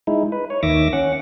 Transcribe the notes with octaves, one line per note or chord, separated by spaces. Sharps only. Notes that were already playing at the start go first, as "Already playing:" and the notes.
G#3 D#4 E4
B4
C#5
D#2 D#3 E5 D6 A#6
C#4 F#5